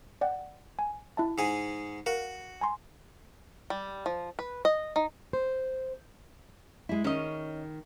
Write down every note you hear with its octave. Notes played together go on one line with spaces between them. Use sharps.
D5 F#5 G5
G#5
E4 E5 A5
G#2 G#4
F#4 A#4 F5
G#5 A#5 C6
G3
F3
B4
D#5
D#4
C5
G#3 E4
D#3 C#4 D#5